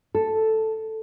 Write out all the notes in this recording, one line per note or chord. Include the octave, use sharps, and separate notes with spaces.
A4